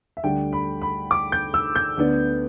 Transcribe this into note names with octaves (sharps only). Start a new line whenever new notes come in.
E5
D2 D3 G3 D4 G5
B5
B5
D6
G6
E6
G6
D2 D3 B3 D4